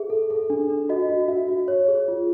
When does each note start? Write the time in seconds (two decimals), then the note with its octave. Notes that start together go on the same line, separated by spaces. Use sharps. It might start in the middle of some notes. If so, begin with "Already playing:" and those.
Already playing: G#4 E5
0.10 A4
0.30 A4
0.50 D4
0.70 D4
0.89 F#4 D#5
1.09 F#4
1.28 F#4 E5
1.48 F#4
1.68 C#5
1.88 G#4
2.08 F4